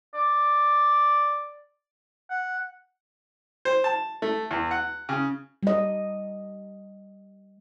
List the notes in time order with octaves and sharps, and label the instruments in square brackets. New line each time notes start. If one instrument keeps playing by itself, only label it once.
[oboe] D5
F#5
[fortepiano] C5
A5
A3
E2
F#5
C#3
[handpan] G3 D#5